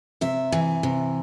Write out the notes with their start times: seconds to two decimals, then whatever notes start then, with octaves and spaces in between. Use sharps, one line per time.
0.21 C3 E5
0.52 E3
0.83 C3